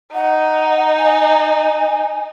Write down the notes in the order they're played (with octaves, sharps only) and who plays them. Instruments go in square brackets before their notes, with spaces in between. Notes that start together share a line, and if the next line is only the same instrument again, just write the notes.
[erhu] D#4 [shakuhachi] F#5
[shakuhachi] G#5